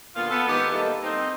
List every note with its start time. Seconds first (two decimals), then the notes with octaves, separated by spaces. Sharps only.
0.16 A#2 D3 B3 F4
0.31 B3 A4
0.48 G#2 D#3 B3 G4 B4
0.71 G3 A#3 D#4 E4 G4 A4
1.03 C4 D#4